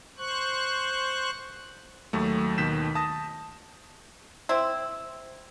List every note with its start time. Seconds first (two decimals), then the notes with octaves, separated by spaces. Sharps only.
0.18 C5 C#6 F#6
2.13 D#2 F#3 A3
2.58 D#2 B2 D#3 G6 B6 E7
2.95 A5 D#6 A#6
4.49 C4 E4